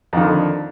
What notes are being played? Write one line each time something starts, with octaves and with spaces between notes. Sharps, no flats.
F2 D3 D#3